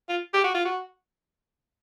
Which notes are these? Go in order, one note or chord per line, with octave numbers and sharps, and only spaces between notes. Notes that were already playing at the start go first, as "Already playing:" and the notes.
F4
G4
F#4
F4
F#4